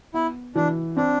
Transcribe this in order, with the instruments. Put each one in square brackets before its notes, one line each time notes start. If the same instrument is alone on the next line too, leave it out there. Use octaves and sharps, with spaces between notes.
[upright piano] B3 [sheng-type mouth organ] E4
[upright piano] E3 [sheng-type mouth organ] D4
[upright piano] C4 [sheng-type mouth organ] D4